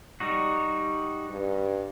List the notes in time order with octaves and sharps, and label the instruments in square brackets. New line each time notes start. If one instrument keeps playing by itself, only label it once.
[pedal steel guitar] G3 D#4 F#4
[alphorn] G2